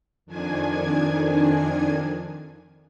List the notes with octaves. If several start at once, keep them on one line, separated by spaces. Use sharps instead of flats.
F2 D#3 D4 G#5 G#6